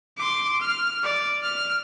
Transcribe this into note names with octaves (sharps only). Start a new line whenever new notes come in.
C6 D6
F6
D5
F6